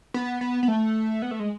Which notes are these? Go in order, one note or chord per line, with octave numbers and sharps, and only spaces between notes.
B3
B3
B3
A3
B3
A3
G#3